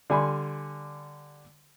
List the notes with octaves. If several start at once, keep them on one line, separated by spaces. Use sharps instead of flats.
D3 G3 G#5 B5 C6